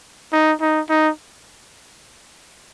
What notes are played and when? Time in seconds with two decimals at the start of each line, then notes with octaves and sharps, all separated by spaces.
0.33 D#4
0.61 D#4
0.89 D#4